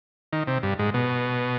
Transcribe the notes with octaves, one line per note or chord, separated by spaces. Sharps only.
D#3
C3
G2
G#2
B2